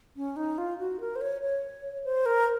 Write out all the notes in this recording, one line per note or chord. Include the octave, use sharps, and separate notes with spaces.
C#4
D#4
F4
F#4
A#4
C5
C#5
C#5
C5
A#4